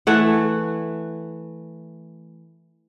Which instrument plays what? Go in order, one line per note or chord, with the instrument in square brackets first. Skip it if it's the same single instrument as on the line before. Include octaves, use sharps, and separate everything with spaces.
[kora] E3 A3 F#5